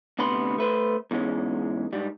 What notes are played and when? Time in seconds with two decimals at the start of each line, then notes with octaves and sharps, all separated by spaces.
0.19 D2 C3 B3 B5 C6
0.58 A3 B4 C5
1.11 E2 G#2 G#3 C#4
1.93 G#2 G3